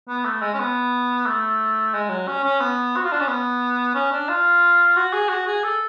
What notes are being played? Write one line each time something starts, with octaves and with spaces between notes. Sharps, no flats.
B3
A3
G#3
C#4
B3
A3
G#3
F#3
C#4
C#4
B3
F#4
F4
D4
C#4
B3
C#4
D4
F4
F#4
G#4
F#4
G#4
A4